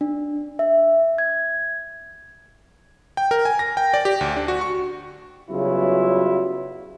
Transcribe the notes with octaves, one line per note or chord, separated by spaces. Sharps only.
D4
E5
G#6
G5
A#4
G#5
A#6
G5
D5
G4
D2
D4
F#4
C#6
C#3 F#3 G3 B3 E4 F4